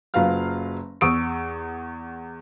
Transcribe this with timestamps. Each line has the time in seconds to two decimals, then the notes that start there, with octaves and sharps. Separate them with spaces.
0.14 F#1 F#3 F4 B4 F5 F6
1.01 E2 C#6 D#6 E6 D7